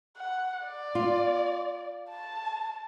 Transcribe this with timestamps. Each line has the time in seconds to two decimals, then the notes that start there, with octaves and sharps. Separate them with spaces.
0.17 F#5
0.65 D5
0.95 F4
2.10 A5